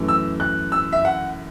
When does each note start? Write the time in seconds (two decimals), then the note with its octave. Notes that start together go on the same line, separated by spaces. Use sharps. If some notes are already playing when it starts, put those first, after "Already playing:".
Already playing: F#2 E3 A3
0.08 E6
0.40 F#6
0.72 E6
0.92 E5
1.05 F#5